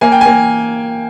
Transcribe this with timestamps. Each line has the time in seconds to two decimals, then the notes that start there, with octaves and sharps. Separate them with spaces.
0.01 A#3 G#5
0.12 G5
0.21 A#3 G#5